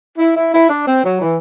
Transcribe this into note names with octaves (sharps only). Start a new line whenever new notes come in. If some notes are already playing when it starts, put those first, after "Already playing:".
E4
E4
E4
D4
C4
F#3
E3